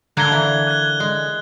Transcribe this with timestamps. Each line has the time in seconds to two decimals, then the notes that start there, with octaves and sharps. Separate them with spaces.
0.17 D3 A#3 F5 A#5 F#6 G#6 G7
0.32 E3
0.67 F#6 G#6
1.00 G#3